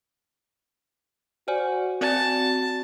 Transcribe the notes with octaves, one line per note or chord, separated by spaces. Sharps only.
F#4 C5 D5 G#5
C4 F#4 D5 G#5 A5